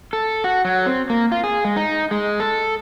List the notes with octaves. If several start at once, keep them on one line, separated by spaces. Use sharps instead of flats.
A4
F#4
F#3
C4
A#3
F4
G#4
G#3
D#4
G#3
A4